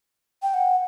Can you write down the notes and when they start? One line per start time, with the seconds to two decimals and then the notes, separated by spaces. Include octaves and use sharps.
0.43 G5
0.54 F#5